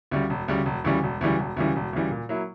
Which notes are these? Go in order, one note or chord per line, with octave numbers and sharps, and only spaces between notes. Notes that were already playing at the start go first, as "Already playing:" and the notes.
D2 C#3 G3
E1
D2 C#3 G3
E1
D2 C#3 E3 G3
E1
D2 C#3 E3 G3
E1
D2 C#3 E3 G3
E1
D2 C#3 E3 G3
A#2
F#3 A#3 E4